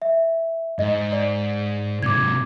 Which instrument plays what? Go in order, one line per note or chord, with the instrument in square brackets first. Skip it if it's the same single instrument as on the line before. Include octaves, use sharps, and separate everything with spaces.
[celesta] E5
[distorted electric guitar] G#2 [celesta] D#5
[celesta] D5
[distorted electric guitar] G#2 C3 [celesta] D6 G#6